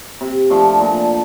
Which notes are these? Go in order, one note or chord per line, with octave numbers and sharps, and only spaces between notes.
C3
F3 A3 D4
A#2